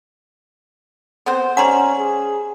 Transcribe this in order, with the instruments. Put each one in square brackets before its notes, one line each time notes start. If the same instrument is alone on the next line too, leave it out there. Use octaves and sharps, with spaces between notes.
[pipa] B3 C4 C5
[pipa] G3 C5 C#5 [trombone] C#4 [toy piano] F#5 A#5 C6
[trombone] G#4